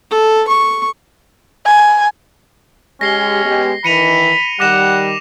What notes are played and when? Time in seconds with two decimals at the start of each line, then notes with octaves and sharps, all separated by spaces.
0.11 A4
0.48 C#6
1.66 G#5
3.01 G#3 C#4 G4 A#6 C7 G7
3.45 G#3 B3 G4
3.84 D#3 E3 B5 C#7 D#7 F7
4.60 D#3 G3 F#5 D6 A#6 E7